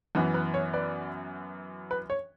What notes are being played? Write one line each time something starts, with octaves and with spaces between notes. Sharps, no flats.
F#2 E3 B3
B4
C#5
B4 D5
B4
C#5